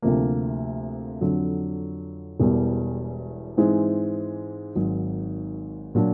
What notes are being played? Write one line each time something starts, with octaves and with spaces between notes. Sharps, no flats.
D2 C3 F3 A#3
F2 D3 F#3
E1 E2 B2 G3
G#2 E3 G#3 C4
G#1 G#2 D#3 F#3
A#2 F#3 A#3 D4